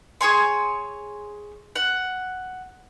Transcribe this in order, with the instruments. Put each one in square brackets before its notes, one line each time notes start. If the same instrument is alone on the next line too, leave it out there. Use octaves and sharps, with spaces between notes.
[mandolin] G#4 C#5 G#5 C6
F#5